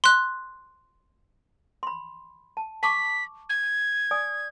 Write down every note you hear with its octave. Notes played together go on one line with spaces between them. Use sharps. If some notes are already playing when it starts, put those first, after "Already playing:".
C6 F#6
B5 C6
A5
A5 C#6 D6 B6
G#6
D5 G#5 D#6